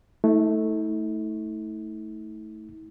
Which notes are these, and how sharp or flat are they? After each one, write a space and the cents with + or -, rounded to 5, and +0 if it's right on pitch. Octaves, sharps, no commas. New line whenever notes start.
A3 +0 E4 -45